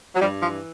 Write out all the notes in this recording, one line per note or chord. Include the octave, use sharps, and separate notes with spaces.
F#3
G2 F3 G3
E3 F3